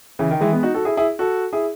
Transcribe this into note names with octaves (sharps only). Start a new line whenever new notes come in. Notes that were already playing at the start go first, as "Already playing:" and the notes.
C#3 E3
D#3
E3 G#3
G#3 B3
D#4 F#4
F#4 A4
E4 G#4
E4 G#4
F#4 A4
E4 G#4